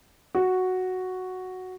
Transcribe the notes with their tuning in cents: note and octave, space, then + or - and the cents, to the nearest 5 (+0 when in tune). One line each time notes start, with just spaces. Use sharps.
F#4 +0